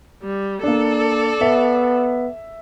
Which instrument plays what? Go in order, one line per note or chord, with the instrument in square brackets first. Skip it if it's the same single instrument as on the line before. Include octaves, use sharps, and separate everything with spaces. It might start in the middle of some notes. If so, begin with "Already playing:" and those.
[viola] G3
[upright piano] A#3 D4 [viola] A4 D5
[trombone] B3 [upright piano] E5